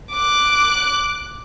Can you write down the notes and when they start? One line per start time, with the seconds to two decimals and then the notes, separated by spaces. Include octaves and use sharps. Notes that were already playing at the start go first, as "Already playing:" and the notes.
0.12 D6 F#6